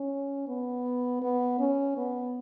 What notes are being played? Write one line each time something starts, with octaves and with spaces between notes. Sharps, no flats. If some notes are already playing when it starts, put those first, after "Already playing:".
Already playing: C#4
B3
B3
C#4
B3